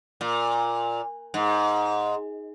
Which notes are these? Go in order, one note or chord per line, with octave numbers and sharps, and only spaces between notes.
A#2
G#2